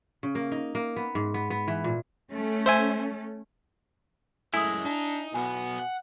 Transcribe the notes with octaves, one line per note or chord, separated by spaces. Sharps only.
C#3
A#3
D#4
A#3
B3
G#2
B3
B3
E3
A#2
A3 C#4
C5 E5 G#5
F#2 G#3 A3 E4 G#5 D#6
D4 D#4
B1 B2 B3 G#5
F#5